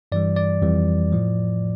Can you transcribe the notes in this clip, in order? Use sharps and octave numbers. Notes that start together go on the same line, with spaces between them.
G2 E3 G3 D5
D5
F2 E3 G3
A2 F3